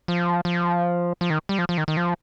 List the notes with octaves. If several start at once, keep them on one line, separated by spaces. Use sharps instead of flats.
F3
F3
F3
D#3
G3
F3
F3
D#3
D#3
F3